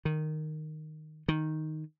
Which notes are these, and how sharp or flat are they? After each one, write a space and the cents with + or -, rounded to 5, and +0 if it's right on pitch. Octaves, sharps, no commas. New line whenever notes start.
D#3 -10
D#3 +0